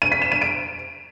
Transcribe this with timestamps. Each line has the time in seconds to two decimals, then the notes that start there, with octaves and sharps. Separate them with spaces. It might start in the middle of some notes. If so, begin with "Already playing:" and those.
0.02 D#7
0.12 B6
0.22 E7
0.32 D#7
0.42 D7